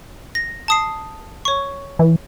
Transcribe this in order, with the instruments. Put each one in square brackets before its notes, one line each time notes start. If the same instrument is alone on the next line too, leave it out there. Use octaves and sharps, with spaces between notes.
[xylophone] A#6
A5 D#6 C7
C#5 C#6
[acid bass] E3